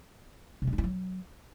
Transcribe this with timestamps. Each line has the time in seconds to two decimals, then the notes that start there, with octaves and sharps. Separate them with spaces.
0.62 C3
0.67 G3
0.73 D#4
0.78 E4
0.84 F#3